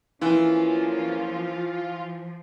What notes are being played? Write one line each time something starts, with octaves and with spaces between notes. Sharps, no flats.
E2 E3 F3 A#3 C#4 F4